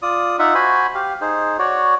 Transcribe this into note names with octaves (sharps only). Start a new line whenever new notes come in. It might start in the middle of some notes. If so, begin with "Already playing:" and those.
F4 D5 D#6
D#4 F4 E5 F#5
F#4 C5 G#5 B5
G4 F5
D#4 G#4 C5
F#4 C#5 D5